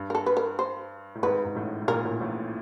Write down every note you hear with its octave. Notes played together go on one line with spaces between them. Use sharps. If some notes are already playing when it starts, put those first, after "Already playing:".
Already playing: G2
A#4
A4
B4
A#4
C5
A2
G#1 G#2 B4
G#2
A1 A2
A2
A#1 A#2 A#4
A1 A2
A1 A2